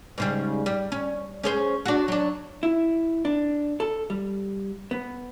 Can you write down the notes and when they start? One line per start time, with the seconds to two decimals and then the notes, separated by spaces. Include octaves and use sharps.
0.18 G#2 C#3 G3
0.66 G3
0.92 C#4
1.43 C#4 G#4 C5
1.86 D4 F#4
2.08 F#3 D4
2.63 E4
3.25 D4
3.80 A4
4.10 G3
4.91 B3